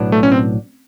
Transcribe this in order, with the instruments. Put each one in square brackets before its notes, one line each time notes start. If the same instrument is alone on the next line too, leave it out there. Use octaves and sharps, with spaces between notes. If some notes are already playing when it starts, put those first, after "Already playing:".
Already playing: [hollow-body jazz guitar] B1 A2 F#3 B3 D4
[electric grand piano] A3
C#4
C4